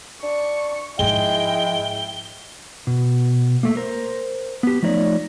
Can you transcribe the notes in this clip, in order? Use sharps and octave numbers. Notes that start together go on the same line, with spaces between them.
D4 C#6
G#2 F3 G#3 E4 G5 G7
B2
A3 A#3
A#4 C5
B3 G4
F3 A3 D#4 C#5 D5